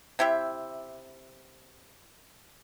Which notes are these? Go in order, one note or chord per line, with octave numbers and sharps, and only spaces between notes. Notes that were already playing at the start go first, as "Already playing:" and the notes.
C3 E4 G4 E5